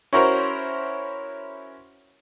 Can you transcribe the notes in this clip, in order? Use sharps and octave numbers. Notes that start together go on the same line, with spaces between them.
C#4 E4 F#4 A#4 C5